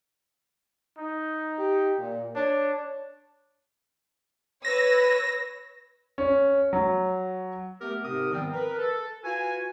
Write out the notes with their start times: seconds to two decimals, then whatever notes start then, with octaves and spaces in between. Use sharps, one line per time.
0.98 D#4
1.58 G4
1.98 A#2
2.35 D4 C#5
4.65 B4 C#5 E6 A#6
6.18 C#4
6.73 F#3
7.81 A3 B3 G4 A#4
8.03 G#2 C3 C4 G4 A#4 D#6
8.31 D#3 F3 G3 B3 C4
8.53 A#4 B4
8.78 A4
9.24 F4 F#4 B4 G#5